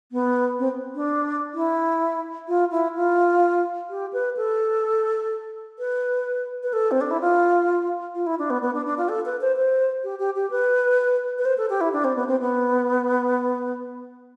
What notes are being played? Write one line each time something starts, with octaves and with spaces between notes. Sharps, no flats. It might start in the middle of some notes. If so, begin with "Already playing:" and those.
B3
C4
D4
E4
F4
E4
F4
G4
B4
A4
B4
B4
A4
C4
D4
E4
F4
F4
E4
D4
B3
B3
D4
D4
F4
A4
B4
C5
C5
G4
G4
G4
B4
B4
C5
A4
G4
E4
D4
C4
B3
C4
B3